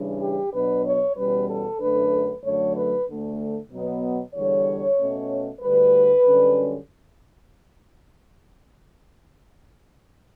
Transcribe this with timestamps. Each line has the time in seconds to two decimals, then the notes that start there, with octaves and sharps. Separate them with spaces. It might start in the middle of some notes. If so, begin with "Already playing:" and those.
Already playing: C#3 E3 G3 D4
0.20 G4
0.52 B2 F#3 B3 D4 B4
0.85 C#5
1.16 E2 B2 G3 C#4 B4
1.49 A4
1.80 F#2 D3 A3 D4 B4
2.43 F#2 D3 F#3 A3 C#5
2.75 B4
3.07 D2 D3 A3
3.71 B2 F#3 B3
4.34 E2 D3 G3 C#5
4.97 B2 A3 C#4
5.61 D2 D3 G3 B4
6.25 F#2 D3 G3 C#4